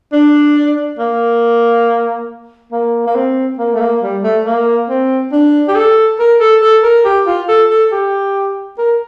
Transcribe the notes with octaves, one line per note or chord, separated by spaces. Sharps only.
D4
A#3
A#3
A#3
C4
A#3
A3
A#3
G3
A3
A#3
C4
D4
G4
A4
A#4
A4
A4
A#4
G4
F4
A4
A4
G4
A#4